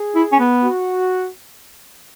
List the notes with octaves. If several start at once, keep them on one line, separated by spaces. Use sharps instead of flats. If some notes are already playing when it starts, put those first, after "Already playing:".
Already playing: G#4
E4
C#4
B3
F#4